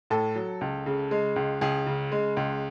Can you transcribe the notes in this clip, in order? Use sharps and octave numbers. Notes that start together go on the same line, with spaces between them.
A2 A4
F#3
C#2
C#3
G#3
C#2
C#2 G#4
C#3
G#3
C#2